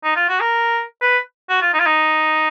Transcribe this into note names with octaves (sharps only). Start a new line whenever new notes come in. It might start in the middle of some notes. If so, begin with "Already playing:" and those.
D#4
F4
F#4
A#4
B4
F#4
F4
D#4
F4
D#4